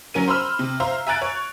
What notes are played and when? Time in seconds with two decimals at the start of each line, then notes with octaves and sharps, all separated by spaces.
0.14 F#3 C#4 A#4 D#7
0.28 C5 B5 C6 E6 F6
0.59 C3
0.80 C5 E5 F5 A#5
1.07 E5 G#5 A#5 F#6 A6 D7
1.22 C#5